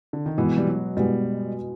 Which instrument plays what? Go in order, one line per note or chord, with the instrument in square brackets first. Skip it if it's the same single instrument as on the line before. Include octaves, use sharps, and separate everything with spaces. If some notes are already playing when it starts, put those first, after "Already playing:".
[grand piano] D3
D#3
[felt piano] B2 G#3 B3 [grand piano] E3
[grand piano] G3
F#3
[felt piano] B2 G#3 B3 [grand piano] G3